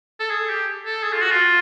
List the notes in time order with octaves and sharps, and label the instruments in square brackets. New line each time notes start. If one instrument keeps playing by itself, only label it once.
[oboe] A4
G#4
G4
A4
G#4
F4
F#4
F4